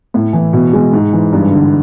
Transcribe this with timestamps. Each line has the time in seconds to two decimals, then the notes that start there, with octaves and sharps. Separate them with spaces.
0.14 A2
0.33 E3
0.53 B2
0.73 G#3
0.93 G#2
1.13 E3
1.33 G2
1.52 D3